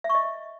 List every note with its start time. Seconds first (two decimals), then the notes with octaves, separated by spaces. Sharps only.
0.04 E5
0.10 C#6
0.15 D#5